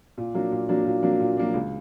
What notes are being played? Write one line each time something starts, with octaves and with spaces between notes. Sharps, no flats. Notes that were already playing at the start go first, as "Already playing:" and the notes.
A#2
F#3 A#3 D4
A#2
F#3 A#3 D4
A#2
F#3 A#3 D4
A#2
F#3 A#3 D4
C#2